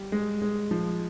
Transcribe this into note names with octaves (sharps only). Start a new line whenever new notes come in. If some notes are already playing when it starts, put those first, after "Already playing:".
Already playing: G3
G#3
G#3
F3